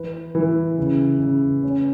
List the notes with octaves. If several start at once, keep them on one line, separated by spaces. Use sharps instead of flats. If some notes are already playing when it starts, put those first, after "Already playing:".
Already playing: E3 B4
E3
C#3
C#3
C#4